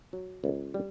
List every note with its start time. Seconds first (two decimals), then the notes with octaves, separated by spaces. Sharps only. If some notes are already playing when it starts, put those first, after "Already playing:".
0.13 F#3
0.44 C#2
0.74 G3